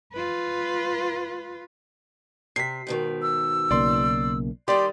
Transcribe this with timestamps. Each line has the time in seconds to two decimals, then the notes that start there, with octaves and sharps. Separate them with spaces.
0.13 F4 B4
2.56 C3 B6 C7
2.87 G#2 B2 D#3
3.22 E6
3.71 B1 C#3 A#3 D5 C6
4.68 D#3 G3 G4 D5 C6